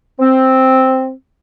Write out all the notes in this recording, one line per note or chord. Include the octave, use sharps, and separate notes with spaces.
C4